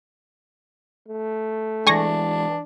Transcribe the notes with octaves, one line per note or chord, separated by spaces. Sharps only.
A3
E3 G#3 D4 G#5 C#6 A#6